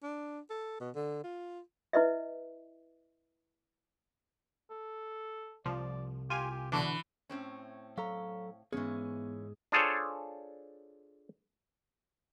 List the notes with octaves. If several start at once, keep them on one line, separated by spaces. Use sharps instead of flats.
D4
A4
B2
D3
F4
E4 B4 D#5 E5
A4
C2 F3 D5
F4 G4 G#5
G4
B2 D3 E3 D4 F#4
A2 C4 C#4
F#3 A4 F5 A#5 C#6
G#2 E3 F3 B3 C#4 G#4
D4 F4 G#4 A4 C5 C#5